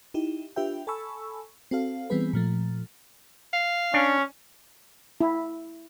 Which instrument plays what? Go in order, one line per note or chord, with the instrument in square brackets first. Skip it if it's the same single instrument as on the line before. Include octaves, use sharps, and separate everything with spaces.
[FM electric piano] D#4 E4 G4
D4 F4 G4 B4 E5 G5
A4 G#5 A5 B5 C#6 E6
C4 F#4 A4 F5
E3 G3 B3 C4 G#4 B4
A#2 F3 A3
[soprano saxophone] F5
[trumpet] C#4 [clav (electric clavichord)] D4
[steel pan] E4